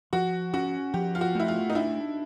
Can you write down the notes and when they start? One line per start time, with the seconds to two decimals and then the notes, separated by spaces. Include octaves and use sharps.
0.13 F3 F#4
0.54 C#4 F#4
0.93 F3 G4
1.15 F4
1.21 F#4
1.35 A3 E4
1.48 F4
1.70 D#4
1.75 D4 E4